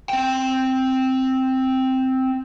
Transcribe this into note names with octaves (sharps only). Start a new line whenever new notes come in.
C4 G5